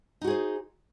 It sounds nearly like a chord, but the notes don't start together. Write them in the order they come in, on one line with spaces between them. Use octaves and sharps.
D#4 F#4 G#4 C5